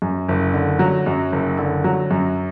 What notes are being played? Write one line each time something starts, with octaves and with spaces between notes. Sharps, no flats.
F#2
F#1
D3
F#3
F#2
F#1
D3
F#3
F#2